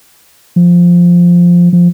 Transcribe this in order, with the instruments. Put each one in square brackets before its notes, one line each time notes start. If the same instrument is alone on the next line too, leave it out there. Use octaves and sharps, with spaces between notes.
[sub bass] F3
F3